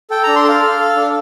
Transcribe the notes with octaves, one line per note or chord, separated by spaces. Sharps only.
A4 G5
D4 A#5
C6
A4 F5
A4
A4
D4